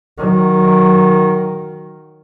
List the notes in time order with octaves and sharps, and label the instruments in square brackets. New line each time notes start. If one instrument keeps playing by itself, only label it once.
[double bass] D#3 F#3